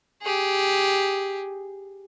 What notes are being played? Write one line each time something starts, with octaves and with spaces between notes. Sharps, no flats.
G4 G#4